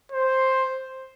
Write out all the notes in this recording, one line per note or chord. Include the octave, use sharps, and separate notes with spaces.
C5